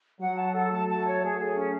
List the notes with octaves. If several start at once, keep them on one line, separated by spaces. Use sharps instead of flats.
F#3 F#5
A5
A4
F#3 A3 A5
A5
C#5
F#3 A3 G#4
G#4
C#4